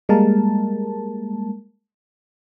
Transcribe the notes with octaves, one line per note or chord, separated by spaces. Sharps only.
G3 G#3 A#3 A#4 A5